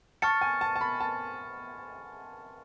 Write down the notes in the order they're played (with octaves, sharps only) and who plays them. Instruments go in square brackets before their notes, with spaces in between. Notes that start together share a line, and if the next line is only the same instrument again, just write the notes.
[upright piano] A5 [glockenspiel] C#6 F6 A6 C#7
[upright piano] G#5
A5
A5
B5
A5